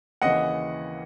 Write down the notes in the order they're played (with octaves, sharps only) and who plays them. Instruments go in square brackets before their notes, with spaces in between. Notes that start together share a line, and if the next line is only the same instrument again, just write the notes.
[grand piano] D#2 C#3 E3 D#5 F#5